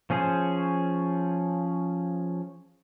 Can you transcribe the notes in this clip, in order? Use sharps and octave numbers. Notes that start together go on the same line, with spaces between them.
F3 C#4 G#4 C5